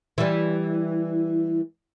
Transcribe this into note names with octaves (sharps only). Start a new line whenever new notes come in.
E3 G3